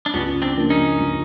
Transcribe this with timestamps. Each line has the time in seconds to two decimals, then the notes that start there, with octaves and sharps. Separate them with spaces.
0.06 D4
0.14 C#2 B3 C#4
0.42 C4 D4
0.56 C#3 F3 A#3 D4
0.70 C#4 D#4
0.99 C#2